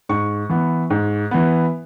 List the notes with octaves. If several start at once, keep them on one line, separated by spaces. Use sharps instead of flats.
G#2 C#6
E3 B3
G#2
E3 B3